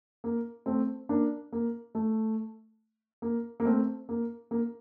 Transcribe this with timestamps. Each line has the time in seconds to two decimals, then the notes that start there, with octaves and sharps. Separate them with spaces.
0.24 A#3
0.66 A3 C4
1.09 A#3 D4
1.53 A#3
1.95 A3
3.22 A#3
3.60 A#3
3.65 A3 C4
4.09 A#3
4.51 A#3